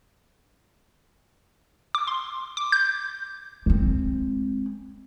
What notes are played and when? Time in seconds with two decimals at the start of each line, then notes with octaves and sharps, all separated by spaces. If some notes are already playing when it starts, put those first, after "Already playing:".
1.95 D6
2.07 C6
2.57 D6
2.72 G6
3.66 G#3 C4